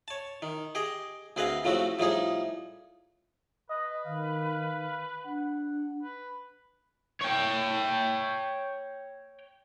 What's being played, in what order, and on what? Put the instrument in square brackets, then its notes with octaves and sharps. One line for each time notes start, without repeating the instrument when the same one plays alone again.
[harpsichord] C#5 A5
D#3
G4 G#4 D#5
D2 C4 G#4 B4 D#5 F5
A2 C#3 F3 A3 C4 F#4
A2 F3 G3 D#4 G#4
[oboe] B4 [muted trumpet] D#5
[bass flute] D#3 [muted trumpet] F5
[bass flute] D4 [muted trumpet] F#5
[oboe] B4
[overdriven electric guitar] C#5 G5